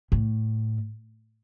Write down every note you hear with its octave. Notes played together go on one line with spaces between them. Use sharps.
A2